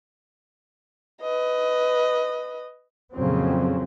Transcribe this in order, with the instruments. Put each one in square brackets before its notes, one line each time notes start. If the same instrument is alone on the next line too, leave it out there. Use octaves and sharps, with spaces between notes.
[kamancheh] B4 D#5
[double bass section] F2 A#2 C#3 F#3 C4